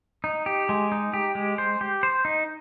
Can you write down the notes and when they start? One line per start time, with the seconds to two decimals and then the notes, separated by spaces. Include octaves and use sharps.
0.24 D#4
0.46 G4
0.69 G#3
0.92 D#4
1.14 G4
1.35 G#3
1.58 C5
1.81 G4
2.03 C5
2.25 D#4